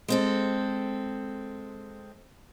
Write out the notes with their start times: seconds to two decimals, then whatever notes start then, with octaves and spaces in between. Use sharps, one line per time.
0.08 G#3 C4 A4